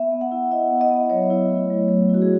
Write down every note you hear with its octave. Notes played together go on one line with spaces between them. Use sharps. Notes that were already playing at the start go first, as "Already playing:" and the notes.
Already playing: B3 E5
B3
F#5
E4
E4 D#5
B3
D#5
B3
F#3 C#5
E4
A3
F#3
F#3
E4
F#4
G#4